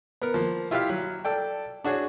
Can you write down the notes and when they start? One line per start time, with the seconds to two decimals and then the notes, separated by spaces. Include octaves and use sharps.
0.22 B3 A#4
0.34 F3 A#3
0.71 E4 F4 G4 E5 F5
0.89 F#3
1.25 A4 D5 G5
1.84 D4 F#4 G#4 C#5